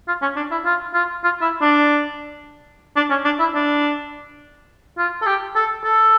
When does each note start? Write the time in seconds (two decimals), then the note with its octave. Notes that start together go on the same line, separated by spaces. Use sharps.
0.08 F4
0.22 C#4
0.36 D4
0.51 E4
0.65 F4
0.94 F4
1.24 F4
1.42 E4
1.62 D4
2.96 D4
3.10 C#4
3.25 D4
3.39 E4
3.54 D4
4.98 F4
5.22 A4
5.26 G4
5.56 A4
5.84 A4